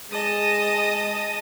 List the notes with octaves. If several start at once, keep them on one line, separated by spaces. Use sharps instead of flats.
G#3 D#5 A5 D#6